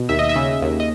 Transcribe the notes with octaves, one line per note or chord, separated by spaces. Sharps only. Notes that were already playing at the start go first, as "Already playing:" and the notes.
Already playing: B2
D#2 E5
D#5
E5
C#3
D#2
D#5